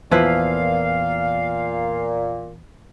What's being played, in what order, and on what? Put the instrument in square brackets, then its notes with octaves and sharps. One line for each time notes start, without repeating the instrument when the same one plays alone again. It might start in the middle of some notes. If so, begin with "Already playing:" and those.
[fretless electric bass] E2 [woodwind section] A#2 [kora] F3 E4 B4 [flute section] F5